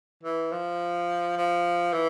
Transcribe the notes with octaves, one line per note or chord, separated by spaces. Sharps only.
E3
F3
F3
E3